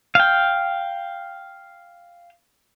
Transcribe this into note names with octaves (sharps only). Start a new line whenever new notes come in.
F5 G5